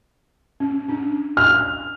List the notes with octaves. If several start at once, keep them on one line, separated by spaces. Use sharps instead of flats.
C#4
C#4 D4
F6